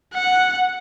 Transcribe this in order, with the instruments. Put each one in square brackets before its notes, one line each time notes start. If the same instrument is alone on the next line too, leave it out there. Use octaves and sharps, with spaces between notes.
[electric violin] F#5